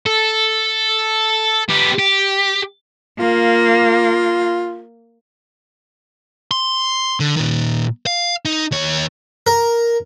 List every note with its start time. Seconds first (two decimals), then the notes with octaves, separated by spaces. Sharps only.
0.06 A4
1.69 B3 G4
1.99 G4
3.20 A#3 F4
6.51 C6
7.20 D3
7.36 A#2 D#3
8.07 F5
8.45 D#4
8.71 D#2 C#5
9.47 A#4